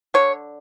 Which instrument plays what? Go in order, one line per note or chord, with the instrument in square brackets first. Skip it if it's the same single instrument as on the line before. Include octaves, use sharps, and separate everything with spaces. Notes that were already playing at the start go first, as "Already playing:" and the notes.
[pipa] D3 C#5